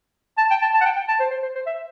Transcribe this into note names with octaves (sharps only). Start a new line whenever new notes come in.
A5
G5
A5
A5
F#5
G5
G5
A5
C5
C5
C5
C5
E5